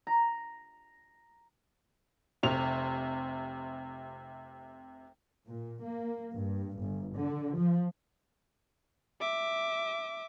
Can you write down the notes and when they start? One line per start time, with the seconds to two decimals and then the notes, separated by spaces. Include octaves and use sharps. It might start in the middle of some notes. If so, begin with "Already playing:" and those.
0.07 A#5
2.43 F1 C3 F7
5.47 A#2
5.84 A#3
6.34 G2
6.82 G1
7.15 D3
7.55 F3
9.21 E5 D6